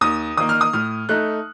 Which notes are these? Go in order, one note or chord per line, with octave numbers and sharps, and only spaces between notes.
D#2 D#6
D#3 A#3 D#6
F6
D#6
A2 F6
A3 D#4 F#6